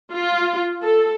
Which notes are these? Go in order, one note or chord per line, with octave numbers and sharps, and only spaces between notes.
F4
A4